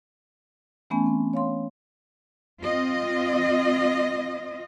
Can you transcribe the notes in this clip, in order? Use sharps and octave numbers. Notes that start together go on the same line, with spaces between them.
E3 A3 B3 C#4 G#5
C4
C#5 F5 C6
C4 F4 D#5